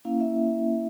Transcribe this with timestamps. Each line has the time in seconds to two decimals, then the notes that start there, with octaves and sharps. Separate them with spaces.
0.05 A#3 C#4 E4 F5
0.20 E5